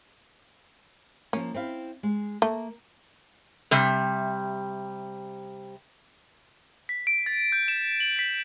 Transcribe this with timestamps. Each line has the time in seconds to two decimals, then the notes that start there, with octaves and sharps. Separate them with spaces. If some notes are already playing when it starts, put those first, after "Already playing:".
1.33 F3 A#3 C#4
1.54 C4 E4 F5
2.03 G#3
2.42 A3 A#3
3.71 C3 G3
6.89 B6
7.07 D7
7.26 A6
7.52 G6
7.68 E7
8.00 F#7
8.19 B6